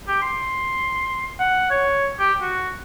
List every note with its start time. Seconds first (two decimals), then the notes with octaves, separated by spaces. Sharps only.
0.08 G4
0.22 C6
1.39 F#5
1.70 C#5
2.19 G4
2.42 F#4